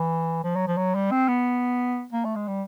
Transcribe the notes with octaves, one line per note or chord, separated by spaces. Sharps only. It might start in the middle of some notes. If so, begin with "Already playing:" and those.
Already playing: E3
F3
F#3
F3
F#3
G3
C4
B3
A#3
A3
G#3
G3